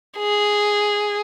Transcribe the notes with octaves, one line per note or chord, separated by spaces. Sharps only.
G#4